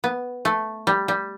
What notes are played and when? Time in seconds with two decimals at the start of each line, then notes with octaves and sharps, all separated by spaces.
0.04 B3
0.45 A3
0.87 G3
1.08 G3